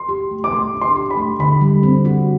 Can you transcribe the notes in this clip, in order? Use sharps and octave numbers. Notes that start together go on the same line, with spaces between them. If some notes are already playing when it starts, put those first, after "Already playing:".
Already playing: C6
G4
A3
D6
A3 C6
D4
C6
G4
B5
A3
D3 B5
G3
C4
F#4